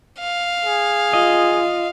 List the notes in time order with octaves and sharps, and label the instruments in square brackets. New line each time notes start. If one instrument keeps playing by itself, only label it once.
[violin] F5
[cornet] G#4
[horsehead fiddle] F4 [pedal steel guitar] D#5